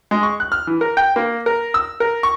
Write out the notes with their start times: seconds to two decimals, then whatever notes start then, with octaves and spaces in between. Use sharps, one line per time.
0.11 G#3
0.23 C#6
0.40 F#6
0.52 F6
0.67 E3
0.81 A#4
0.97 G5
1.16 A#3
1.46 A#4
1.74 E6
2.00 A#4
2.23 C#6